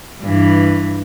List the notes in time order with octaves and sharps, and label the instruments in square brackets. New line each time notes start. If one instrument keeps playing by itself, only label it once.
[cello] G2 E3